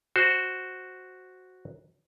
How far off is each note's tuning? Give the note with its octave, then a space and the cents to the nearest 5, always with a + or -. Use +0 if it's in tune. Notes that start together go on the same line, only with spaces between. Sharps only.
F#4 +0 C5 +0